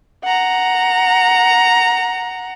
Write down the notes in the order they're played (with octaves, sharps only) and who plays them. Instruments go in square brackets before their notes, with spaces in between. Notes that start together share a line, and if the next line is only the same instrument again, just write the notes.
[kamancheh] F#5 A#5